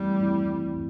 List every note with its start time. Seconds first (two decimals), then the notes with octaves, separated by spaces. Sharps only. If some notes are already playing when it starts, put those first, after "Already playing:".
Already playing: E3 G3 A3 C4 E4
0.22 E3 A3 C4 E4